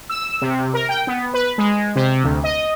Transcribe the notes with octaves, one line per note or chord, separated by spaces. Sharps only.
E6
C3
A#4
G5
B3
B4
G#3
C3
D2
D#5